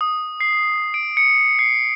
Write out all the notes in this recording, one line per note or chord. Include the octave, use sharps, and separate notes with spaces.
D#6
C7
D7
C#7
C7